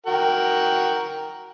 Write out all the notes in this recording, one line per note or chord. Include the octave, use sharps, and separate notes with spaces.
F#4 A#4 G5